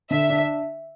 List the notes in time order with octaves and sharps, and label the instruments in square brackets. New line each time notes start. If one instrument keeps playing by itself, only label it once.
[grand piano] D3 [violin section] E5
[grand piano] D4